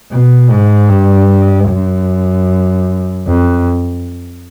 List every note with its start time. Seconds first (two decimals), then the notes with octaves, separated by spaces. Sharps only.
0.11 B2
0.50 G#2
0.89 G2
1.68 F#2
3.26 F2